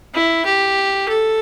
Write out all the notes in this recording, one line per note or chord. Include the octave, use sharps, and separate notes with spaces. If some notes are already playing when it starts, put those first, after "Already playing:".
E4
G4
A4